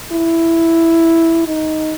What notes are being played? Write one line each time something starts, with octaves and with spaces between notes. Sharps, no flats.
E4
D#4